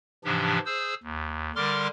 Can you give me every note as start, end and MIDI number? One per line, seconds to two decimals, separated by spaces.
0.25 0.59 44
0.25 0.59 48
0.25 0.59 52
0.25 0.59 53
0.25 0.59 62
0.25 0.59 67
0.66 0.94 68
0.66 0.94 72
0.66 0.94 88
1.03 1.51 39
1.56 1.88 50
1.56 1.88 55
1.56 1.88 70
1.56 1.88 84
1.56 1.88 86
1.56 1.88 89